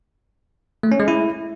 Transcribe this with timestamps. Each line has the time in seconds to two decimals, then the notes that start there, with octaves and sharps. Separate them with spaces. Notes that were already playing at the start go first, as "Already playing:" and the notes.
0.83 A3
0.92 C#4
1.00 G#3
1.08 E4